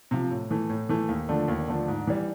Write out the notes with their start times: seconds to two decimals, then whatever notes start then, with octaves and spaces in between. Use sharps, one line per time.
0.11 C3 F3
0.31 A2
0.51 E3 A3
0.69 A2
0.89 E3 A3
1.09 D#2
1.29 D3 F3 A3 D4
1.48 D#2
1.68 D3 F3 A3 D4
1.88 G#2
2.07 E3 G3